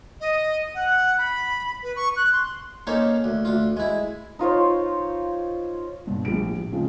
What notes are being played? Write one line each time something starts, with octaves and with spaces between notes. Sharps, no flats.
D#5
F#5
B5
B4
C#6
F#6
C6
A#3 C#4 D#4 A4 C5
D2
D2 F4
G#3 E4
D#4 F4 C5 C#5
G2 B2
A#1 A2 G3 D7
C#3 F3 G#3 C4